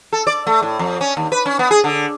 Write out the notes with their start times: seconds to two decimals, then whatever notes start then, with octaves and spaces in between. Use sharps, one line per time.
0.13 A4
0.27 D5
0.47 A3
0.63 A2
0.79 F2
1.01 C#4
1.17 D#2
1.32 B4
1.46 C#4
1.59 B3
1.71 G#4
1.84 D3